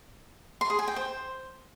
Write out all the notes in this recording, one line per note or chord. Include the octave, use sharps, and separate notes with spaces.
C6
G#4
G#5
G5
C5